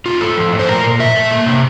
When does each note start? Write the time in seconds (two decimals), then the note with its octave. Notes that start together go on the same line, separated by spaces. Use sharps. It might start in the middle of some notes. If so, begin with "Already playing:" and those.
0.06 A3 F4
0.21 A2 A4
0.37 F3
0.53 A2
0.59 C5
0.68 A#2 A#4
0.83 A#2
0.99 A3 E5
1.16 A3
1.31 A#3
1.47 C3